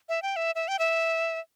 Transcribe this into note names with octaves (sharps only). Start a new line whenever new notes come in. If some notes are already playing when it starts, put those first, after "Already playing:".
E5
G5
E5
E5
G5
E5